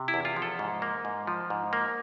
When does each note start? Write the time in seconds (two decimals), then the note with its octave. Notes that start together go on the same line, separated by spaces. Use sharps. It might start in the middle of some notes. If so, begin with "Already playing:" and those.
Already playing: C3
0.08 E4
0.14 E2
0.25 F4
0.36 F3
0.42 A4
0.59 G#2
0.82 A#3
1.05 G#2
1.27 F3
1.50 G#2
1.73 A#3